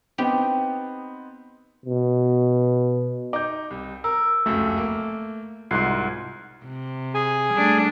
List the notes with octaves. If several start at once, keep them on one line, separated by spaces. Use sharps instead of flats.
B3 C4 D#4 G4
B2
D#4 D6 G6
C2
A#4 E6
F1 C#2 F#2 A3
A#3
C2 G#2 F4 F#4 C6 F#6 C7
C3
G#4 G#5
G3 A3 D4